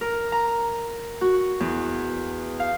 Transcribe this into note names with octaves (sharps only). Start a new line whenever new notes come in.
A#4
A#5
F#4
E2
F5